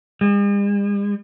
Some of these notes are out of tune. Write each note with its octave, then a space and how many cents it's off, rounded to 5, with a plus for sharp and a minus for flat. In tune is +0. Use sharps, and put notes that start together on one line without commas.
G#3 -45